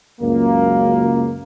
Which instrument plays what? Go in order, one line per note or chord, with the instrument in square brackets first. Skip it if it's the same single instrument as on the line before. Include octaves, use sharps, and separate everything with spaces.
[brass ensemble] C#2 F#2 [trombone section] A#3